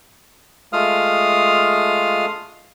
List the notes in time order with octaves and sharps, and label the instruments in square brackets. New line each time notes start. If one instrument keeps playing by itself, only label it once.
[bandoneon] G#3 A3 F4 F5 D#6 F6